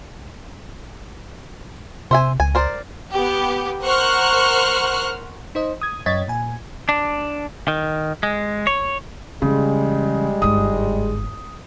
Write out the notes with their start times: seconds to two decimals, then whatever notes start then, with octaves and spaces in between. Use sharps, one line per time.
2.11 C3 C5 E5 G#5
2.40 C#2 G#5
2.55 A#4 C5 D5
3.13 B3 G4
3.83 A#4 C5 F#5 C#6 F6 F#6
5.55 D#4 C5 D#5
5.81 D#6 G#6
6.06 F#2 C#5 D#5 G#6 A6 B6
6.28 A#2 G#5
6.89 D4
7.68 D#3
8.23 G#3
8.67 C#5
9.42 C#3 E3 G3 G#3
10.42 G1 G#2 D#6